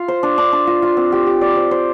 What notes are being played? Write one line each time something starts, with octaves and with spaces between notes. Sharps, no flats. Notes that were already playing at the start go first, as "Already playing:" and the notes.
Already playing: F4 F5
C5
D4
D4
D4
F4
F4
C4
G4
G4
D5
C5
C5